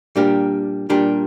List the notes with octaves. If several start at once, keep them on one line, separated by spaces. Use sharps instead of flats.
A#2 G3 D4 G4 A#4
A#2 G3 D4 G4 A#4